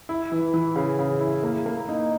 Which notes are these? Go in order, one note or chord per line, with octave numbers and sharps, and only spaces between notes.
E4
E3
E3
C#3
C#3
E4
A#3
A#3
D#4